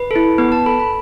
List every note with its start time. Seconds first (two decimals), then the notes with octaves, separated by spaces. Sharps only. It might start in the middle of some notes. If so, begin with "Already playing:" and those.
Already playing: B4
0.11 E4 A4
0.38 B3 B4
0.52 A5
0.66 A4 B5
0.80 B5